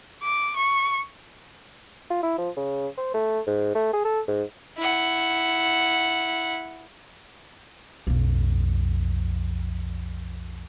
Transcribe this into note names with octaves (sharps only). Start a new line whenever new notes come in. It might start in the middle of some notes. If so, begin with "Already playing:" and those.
D6
C#6
F4
E4
F3
C#3
C5
A3
G#2
A3
G#4
A4
G#2
E4 F#5
B1 F2